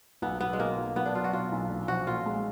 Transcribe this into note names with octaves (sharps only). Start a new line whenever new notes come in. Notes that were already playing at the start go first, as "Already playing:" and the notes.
B1 B3
F#3 B3
G#3
B2 A#3
B1
B1 B3
D4
F#3 F4
F#4
B2 F4
B1
A#1
F3 F#4
A#2 F4
G#3